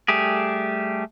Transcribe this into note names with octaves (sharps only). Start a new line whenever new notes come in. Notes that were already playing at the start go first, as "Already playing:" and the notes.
G3 A3 G4 G#4